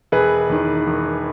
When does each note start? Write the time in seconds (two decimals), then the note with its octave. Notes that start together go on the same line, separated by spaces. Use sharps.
0.12 E1 G#4 B4
0.49 E2 D#3
0.87 E1